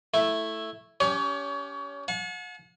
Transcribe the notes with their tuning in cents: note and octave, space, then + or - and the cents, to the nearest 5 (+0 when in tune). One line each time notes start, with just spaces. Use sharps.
A3 +0 E4 +0
C#4 +25 G4 +0 C#5 +35
F#5 -40 A5 -45